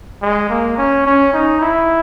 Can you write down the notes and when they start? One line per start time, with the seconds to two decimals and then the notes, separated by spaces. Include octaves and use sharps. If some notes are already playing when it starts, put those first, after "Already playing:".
0.22 G#3
0.50 A#3
0.77 C#4
1.06 C#4
1.33 D#4
1.61 E4